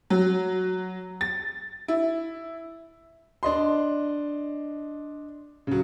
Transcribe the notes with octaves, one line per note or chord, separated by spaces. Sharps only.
F#3
A6
E4
D4 D#5 C6
C#3 F#3